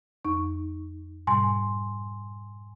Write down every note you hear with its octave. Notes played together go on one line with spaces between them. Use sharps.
F2 D#4 C#6
G#2 B2 G3 G#5 C6